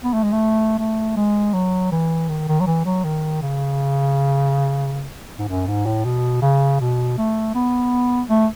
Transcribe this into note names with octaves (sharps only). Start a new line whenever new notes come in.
B3
A3
G#3
A3
A3
G#3
F#3
E3
D#3
D#3
F#3
E3
F#3
D#3
C#3
G#2
F#2
G#2
A2
B2
C#3
B2
A3
B3
A3